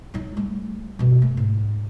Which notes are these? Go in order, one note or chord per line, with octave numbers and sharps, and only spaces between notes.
F#3 D#4
G3 A3
G2 B2
A3
G#2